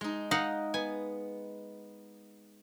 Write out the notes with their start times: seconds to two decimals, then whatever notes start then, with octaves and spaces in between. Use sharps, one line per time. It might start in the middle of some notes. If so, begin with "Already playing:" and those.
0.01 G#3 D#4
0.31 D#4 D#5 F5 F#5
0.74 B3 G#5